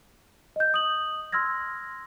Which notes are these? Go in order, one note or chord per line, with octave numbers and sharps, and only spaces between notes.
D#5 G6
D#6 F#7
C6 E6 F6 G#6 A#6